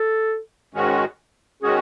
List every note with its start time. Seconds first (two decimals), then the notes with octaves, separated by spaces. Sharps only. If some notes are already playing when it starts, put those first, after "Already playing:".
Already playing: A4
0.74 G#2 D#3 G#3 C#4 F#4
1.63 D#3 G#3 C#4 F#4 G#4